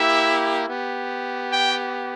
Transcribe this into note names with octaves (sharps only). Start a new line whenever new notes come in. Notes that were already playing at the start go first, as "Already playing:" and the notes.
Already playing: A#3 E4 G4 E5
B3 G4
G5